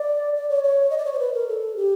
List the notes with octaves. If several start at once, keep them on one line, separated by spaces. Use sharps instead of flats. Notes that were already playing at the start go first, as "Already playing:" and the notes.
Already playing: D5
D5
C#5
C#5
D#5
D5
C#5
C5
B4
A#4
A4
G4